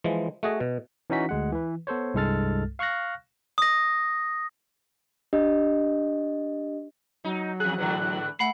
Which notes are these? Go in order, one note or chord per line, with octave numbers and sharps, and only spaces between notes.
E3 F3 G#3
A3 F#4 G#4 D#5
B2
E3 C#4 D#4 F#4 B6
D2 G#3 F#5
E3 B4
B3 A4 C5 C#5
C2 G2 G#3 A4 F6 A6
F5 C#6 F6 F#6 A#6
D#6 A#6
D4 G4 D#5
F#3 D#4
E2 G#4 F#6
G#2 D3 E3
A3 F#5 B5 C7